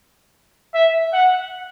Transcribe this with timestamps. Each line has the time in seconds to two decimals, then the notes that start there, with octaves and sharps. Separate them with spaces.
0.74 E5
1.13 F#5